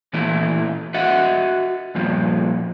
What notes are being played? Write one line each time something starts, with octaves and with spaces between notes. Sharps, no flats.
A#2 E3 A3 E4
F#4 D#5 E5 F#5
G2 A#2 F3